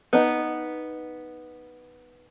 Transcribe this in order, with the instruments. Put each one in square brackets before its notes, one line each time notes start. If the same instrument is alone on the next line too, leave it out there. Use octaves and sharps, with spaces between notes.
[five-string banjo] B3 D#4